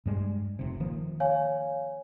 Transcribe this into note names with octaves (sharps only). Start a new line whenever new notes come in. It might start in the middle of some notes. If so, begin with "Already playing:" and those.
G2 G3 G#3
F1 C3
D#3 F3 A#3
C#5 F5 G#5